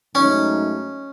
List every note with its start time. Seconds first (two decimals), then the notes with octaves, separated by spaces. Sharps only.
0.15 G#2 F#3 A3 C#4 D#4